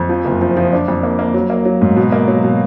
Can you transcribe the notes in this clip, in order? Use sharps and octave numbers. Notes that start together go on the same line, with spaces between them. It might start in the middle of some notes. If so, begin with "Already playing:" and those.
Already playing: F2
F3
F#1
F3
F3
D4
F2
A#3
A#3
F#3
A#3
F#3
G#2
B2
A#3
F#3
B2